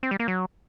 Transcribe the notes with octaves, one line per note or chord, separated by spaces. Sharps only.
C4
G3
A#3
F#3